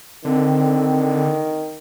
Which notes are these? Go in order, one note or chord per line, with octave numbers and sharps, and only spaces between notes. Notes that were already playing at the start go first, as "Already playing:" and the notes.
D3 D#3 C4